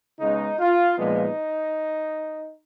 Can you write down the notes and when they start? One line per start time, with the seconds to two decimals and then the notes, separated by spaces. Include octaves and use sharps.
0.19 C#3 G#3 B3 D#4
0.59 F4
0.98 A#2 F3 G#3 B3 D#4